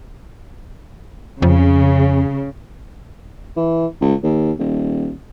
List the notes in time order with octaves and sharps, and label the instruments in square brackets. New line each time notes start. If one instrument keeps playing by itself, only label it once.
[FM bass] F2 [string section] C#3
[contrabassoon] E3
C#2
D#2
D#1